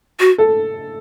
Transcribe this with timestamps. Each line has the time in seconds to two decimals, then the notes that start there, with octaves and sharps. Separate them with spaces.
0.20 F#4
0.38 A4